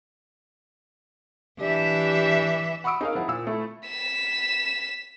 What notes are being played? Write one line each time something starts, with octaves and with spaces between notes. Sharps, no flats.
E3 D4 G4 E5
F#5 B5 C#6 D#6 E6 D7
D#4 G#4 A#4 F5
F3 E4 F#5
A#2 E6
A3 E4
B6 E7